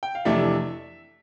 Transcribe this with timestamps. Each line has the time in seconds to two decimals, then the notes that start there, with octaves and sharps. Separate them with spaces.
0.03 G5
0.15 F5
0.25 F2 C3 E3 A3 D4 E5